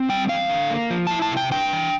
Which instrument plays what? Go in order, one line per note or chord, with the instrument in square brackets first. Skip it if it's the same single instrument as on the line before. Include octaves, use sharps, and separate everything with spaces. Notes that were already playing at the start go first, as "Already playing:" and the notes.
Already playing: [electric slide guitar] C4
G3 G5
E2 F5
D3
A#3
F3
E4 A5
A5
C3
G5
D4 G5
E3